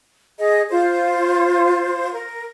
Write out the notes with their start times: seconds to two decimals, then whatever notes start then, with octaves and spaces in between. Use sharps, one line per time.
0.38 G#4 D#5
0.70 F4 C5
2.12 A#4